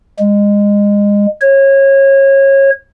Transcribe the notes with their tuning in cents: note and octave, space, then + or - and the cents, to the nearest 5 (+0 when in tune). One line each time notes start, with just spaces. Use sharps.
G#3 -25
C#5 -25